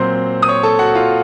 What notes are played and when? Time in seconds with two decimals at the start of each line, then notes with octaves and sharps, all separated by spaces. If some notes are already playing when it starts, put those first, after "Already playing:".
Already playing: A#2 F#3 C4 C5 C6
0.42 D#6
0.48 C#5 C#6
0.63 A4 A5
0.79 F#4 F#5
0.95 F4 F5